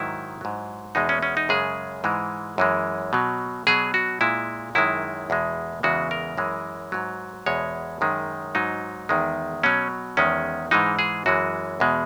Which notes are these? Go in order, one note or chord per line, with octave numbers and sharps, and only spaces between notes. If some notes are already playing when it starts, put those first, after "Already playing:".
Already playing: G#2 D#3 F#3 E4
G#2 F#3
E2 B2 G#3 D#4
C#4
C#4
D#4
F#2 C#3 G#3 G#4
G#2 E3 G#3
F#2 E3 G#3
B2 F#3
B2 F#3 G#4
F#4
A#2 G#3 E4
F#2 D#3 G#3 E4
E2 B2 G#3
E2 C#3 E3 G#3 F#4
A#4
F#2 E3 G#3
G#2 F#3
E2 B2 G#3 C#5
F#2 D#3 G#3
G#2 F#3 D#4
E2 D#3 G#3
B2 F#3 C#4
E2 D#3 G#3 C#4
G#2 E3 G#3 D#4
G#4
F#2 E3 G#3 F#4
E2 B2 G#3